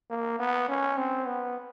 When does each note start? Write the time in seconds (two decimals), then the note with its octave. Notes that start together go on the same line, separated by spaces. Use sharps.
0.10 A#3
0.40 B3
0.69 C#4
0.97 C4
1.26 B3